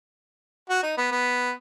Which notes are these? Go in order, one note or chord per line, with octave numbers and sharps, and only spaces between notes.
F#4
D#4
B3
B3